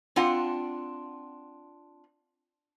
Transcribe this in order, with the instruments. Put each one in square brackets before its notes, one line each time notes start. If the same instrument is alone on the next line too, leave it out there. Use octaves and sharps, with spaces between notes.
[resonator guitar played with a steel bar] C4 D4 F4 F#5